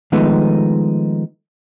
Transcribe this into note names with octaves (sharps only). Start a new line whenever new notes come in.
D#3 F3 G#3 A3 B3 D#4